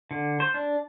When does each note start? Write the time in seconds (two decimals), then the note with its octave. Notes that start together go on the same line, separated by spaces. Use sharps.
0.11 D3
0.40 C5
0.54 D4